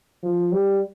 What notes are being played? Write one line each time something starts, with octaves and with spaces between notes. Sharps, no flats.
F3
G3